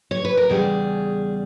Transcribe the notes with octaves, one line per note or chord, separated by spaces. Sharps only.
C#5
B4
A#4
E2 C#3 G3 G#4